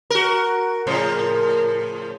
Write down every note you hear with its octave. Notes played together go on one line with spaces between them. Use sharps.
F#4 A#4
A2 C#3 F3